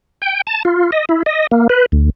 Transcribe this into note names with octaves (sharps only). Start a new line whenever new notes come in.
G5
A5
F4
D#5
E4
D#5
A#3
B4
D2